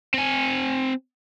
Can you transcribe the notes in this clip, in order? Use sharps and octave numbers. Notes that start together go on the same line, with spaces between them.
C4 G#5